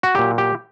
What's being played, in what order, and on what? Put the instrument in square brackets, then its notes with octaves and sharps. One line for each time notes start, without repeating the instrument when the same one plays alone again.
[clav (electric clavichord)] F#4
A#2 F#3 G4
G4